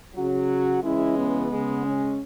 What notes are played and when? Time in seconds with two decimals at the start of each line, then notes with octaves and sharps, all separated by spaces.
0.14 C#3 F#3 F#4
0.83 C#3 E3 G#3 E4
1.17 B3
1.50 C#3 G#3
1.85 C#4